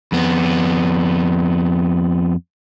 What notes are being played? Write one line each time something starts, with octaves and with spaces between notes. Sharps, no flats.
F2 B3